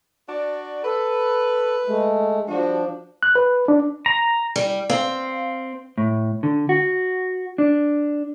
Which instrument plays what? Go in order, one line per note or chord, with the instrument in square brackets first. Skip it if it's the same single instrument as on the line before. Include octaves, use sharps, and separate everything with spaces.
[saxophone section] D4 F#4 D5
[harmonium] A4 [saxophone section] B4
[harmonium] G#3 A3
[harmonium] F3 D4 [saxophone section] G3 F#4
[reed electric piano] F#6
B4
D4
[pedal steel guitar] A#5
[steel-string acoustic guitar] G3
[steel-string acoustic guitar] C4 [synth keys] F5
[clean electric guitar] A2
D3
F#4
D4